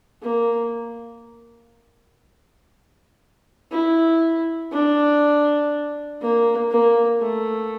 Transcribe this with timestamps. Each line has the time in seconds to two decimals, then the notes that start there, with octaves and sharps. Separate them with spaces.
0.22 A#3
3.71 E4
4.72 D4
6.22 A#3
6.71 A#3
7.21 A3